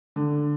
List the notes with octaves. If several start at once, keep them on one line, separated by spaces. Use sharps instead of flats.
D3